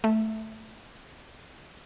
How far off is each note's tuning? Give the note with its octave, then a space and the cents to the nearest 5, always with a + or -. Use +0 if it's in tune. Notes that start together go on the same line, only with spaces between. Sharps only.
A3 +0 E5 -5